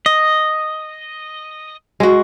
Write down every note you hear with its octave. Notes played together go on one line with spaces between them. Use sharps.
D#5
G#3 F#4